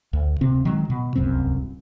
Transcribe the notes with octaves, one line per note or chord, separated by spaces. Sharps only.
D2
D1 C3 C4
D#3 F#3 G#3
B2
D1 C2 F#2 C4